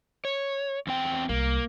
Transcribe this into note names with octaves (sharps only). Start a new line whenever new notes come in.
C#5
E2 C4 G5
C2 A#3